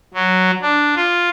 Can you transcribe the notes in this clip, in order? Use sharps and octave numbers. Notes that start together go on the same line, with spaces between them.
F#3
D4
F4